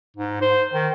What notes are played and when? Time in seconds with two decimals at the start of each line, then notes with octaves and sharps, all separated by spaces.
0.16 G#2
0.42 C5
0.73 D#3